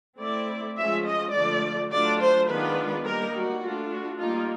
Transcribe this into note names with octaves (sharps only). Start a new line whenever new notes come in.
A3 C4 E4 D5
F3 G#3 C#4 F4 E5
D#5
D3 F3 A3 D5
F#3 A3 D4 F4 D5
C5
D#3 G#3 B3 D4 F4 B4
G3 A#3 D#4 A#4
F#4
A3 D4 F4
F#4
G3 A#3 D#4 F4